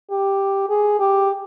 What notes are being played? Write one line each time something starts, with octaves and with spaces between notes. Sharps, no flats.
G4
G#4
G4